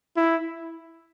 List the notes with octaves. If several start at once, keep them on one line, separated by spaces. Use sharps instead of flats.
E4